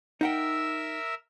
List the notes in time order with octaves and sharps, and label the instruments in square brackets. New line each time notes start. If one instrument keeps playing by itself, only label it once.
[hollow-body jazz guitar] D#4 F#5 G5 [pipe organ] A#4 E5 E6